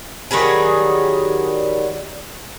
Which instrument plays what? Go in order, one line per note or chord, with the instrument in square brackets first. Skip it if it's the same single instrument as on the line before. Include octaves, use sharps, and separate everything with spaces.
[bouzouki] D#3 F#3 G3 G#4